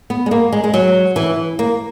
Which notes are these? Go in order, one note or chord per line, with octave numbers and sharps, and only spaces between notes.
B3
G#3
A#3
G#3
G#3
F#3
E3
A#3